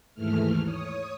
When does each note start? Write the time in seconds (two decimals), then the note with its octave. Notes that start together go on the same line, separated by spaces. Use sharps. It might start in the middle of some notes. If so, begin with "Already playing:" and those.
0.14 D#2 G#2 E3 A3 F6
0.64 C#5 D#6